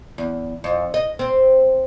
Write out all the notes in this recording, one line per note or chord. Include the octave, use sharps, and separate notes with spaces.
E2
F2
D#5
C4